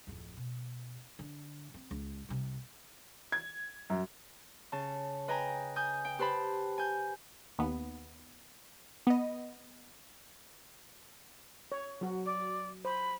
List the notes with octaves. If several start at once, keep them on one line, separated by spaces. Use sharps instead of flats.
D1 F2
B2
D3
C4
C#2
C2 C3
G#6
F#2
C#3 A5
B4 D#5 G5 G#5 A#5
G#5 D#6 G6
G5
G4 B4 C5 A5 B5
G#5 G6
D#2 B3
B3 D#5
C#5
F#3 F#4
D5
C5 B5